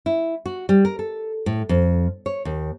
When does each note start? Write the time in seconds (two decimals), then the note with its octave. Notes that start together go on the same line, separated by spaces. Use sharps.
0.06 E4
0.46 F#4
0.69 G3
0.85 A#4
0.99 A4
1.46 A2
1.69 F2
2.26 C#5
2.45 D#2